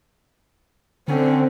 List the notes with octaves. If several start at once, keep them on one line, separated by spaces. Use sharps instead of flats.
D3 C4 C#4